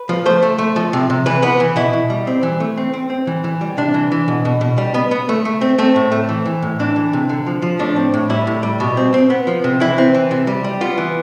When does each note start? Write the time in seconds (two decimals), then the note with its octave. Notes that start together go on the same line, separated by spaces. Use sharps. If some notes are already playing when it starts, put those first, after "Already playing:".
Already playing: B4
0.09 F3
0.26 A3 C5
0.43 A3
0.58 A3
0.76 F3
0.93 C3
1.10 C3
1.26 E3 B4
1.42 B3 B4
1.60 E3
1.76 B2 E4
1.93 B2
2.10 G3
2.27 C4
2.43 E3
2.60 A3
2.77 C4
2.94 C4
3.10 C4
3.27 E3
3.44 E3
3.61 G3
3.77 C3 D4
3.94 E3
4.12 E3
4.28 B2
4.45 B2
4.61 B2
4.78 G3
4.94 B3
5.11 B3
5.29 A3
5.45 A3
5.61 C4
5.78 A3 C4
5.96 A2
6.12 A3
6.29 E3
6.45 E3
6.62 A2
6.80 E3 D4
6.96 E3
7.13 C3
7.29 D3
7.46 F3
7.62 F3
7.79 A2 D4
7.96 C4
8.14 A2
8.30 G3 E4
8.47 A2
8.63 G3
8.80 B2
8.97 C4
9.14 C4
9.30 B3
9.47 F3
9.64 C3
9.80 E3 E4
9.98 C4
10.14 E3
10.31 C3
10.47 G3
10.64 G3
10.81 B3 F4
10.98 E3